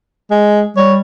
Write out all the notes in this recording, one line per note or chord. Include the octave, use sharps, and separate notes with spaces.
G#3
G3 C#5